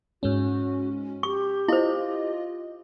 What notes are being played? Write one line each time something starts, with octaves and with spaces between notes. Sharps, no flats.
G#2 G#3 C#4 F#4
G4 C#6
E4 F4 C5 D#5